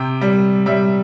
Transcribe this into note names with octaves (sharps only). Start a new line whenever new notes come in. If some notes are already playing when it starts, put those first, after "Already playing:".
Already playing: C3 G5
G3
G3 E5